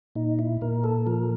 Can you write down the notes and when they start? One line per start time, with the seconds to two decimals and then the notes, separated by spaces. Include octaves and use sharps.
0.15 A#2 D#4
0.39 E4
0.61 A#2 A#4
0.84 A4
1.07 F3 A#4